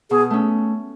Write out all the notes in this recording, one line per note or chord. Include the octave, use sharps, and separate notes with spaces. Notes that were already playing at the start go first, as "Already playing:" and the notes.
B2 G#4
A3 C#4